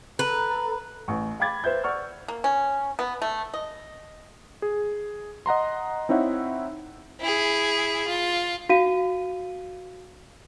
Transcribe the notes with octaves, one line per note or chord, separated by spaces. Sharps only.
A4 B4 A#5
A1 C#6
F5 G5 B5 D6 G#6 A6
B4 C5 E5 G6
D5 F#5 C#6 E6 F6
A#3
C#4
B3
A3
D#5
G#4
D#5 F#5 A#5 C6
C4 D#4 E4 C#5 E5 F#5
E4 G#4
F4
F#4 F5 D#7